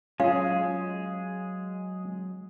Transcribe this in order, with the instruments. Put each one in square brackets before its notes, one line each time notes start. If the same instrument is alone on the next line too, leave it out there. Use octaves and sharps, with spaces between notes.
[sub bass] F#3 [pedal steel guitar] G#3 G#4 [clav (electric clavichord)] C#4 F4 C#5 [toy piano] F5